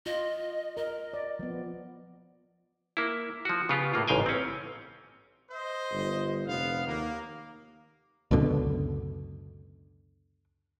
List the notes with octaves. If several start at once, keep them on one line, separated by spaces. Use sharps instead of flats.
F4 D#5
A#4 D#5
D5
F3 B3
A#3 E4
F3 F#4
C#3 B3 F4 G4
A2 A#3 F4
A1 G#2 C#3 F5 G5 G#5
C4 C#4
C5 D#5
G1
F1 B3 F5
D#2 A#3
C#2 F#2 B2 D3